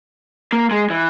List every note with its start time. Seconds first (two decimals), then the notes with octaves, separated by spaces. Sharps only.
0.53 A#3
0.71 G#3
0.90 E3